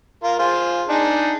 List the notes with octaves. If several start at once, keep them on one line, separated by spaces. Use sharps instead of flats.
F4 A#4 F5
F4 G#4 C5
D4 D#4 G#4